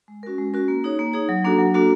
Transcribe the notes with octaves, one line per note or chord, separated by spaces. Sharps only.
G#3
C#4 F#4 A#4
G#3
C#4 F#4 A#4
A#3
D#4 G#4 C#5
A#3
D#4 G#4 C#5
F#3
A#3 D4 F#4 A4
F#3
A#3 D4 F#4 A4